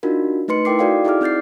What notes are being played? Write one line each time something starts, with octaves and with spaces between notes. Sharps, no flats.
D4 D#4 F4 F#4 A#4
A3 D#4 B4 C6 C#7
E4 A#4 G5 D6 C7
D#4 F#4 A4 D5 F5 G5
D#4 E4 G#4 D5 D6 F6
C4 F6 G6 A6 C7